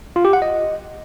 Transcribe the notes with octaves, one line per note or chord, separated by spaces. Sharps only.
F4
G4
F#5
D#5